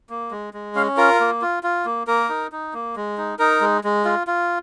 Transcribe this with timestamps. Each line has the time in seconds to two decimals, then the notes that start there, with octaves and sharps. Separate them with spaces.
0.10 A#3
0.31 G#3
0.54 G#3
0.75 C#4 F5
0.97 F4 A#4
1.20 A#3
1.42 F4
1.63 F4
1.85 A#3
2.07 A#3 A#4
2.29 D#4
2.52 D#4
2.74 A#3
2.96 G#3
3.18 D#4
3.39 D#4 A#4
3.61 G#3
3.84 G#3
4.05 F4
4.27 F4